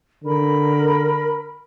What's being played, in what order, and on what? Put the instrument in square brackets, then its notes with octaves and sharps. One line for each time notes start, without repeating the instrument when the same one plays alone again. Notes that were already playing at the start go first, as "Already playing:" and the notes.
[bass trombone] D3 [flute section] A#4 B5